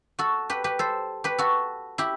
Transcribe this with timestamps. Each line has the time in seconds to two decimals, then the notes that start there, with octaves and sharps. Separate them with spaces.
0.19 F#4 A4
0.50 G4 B4
0.64 G4 B4
0.79 A4 C5
1.24 G4 B4
1.38 F#4 A4
1.98 E4 G4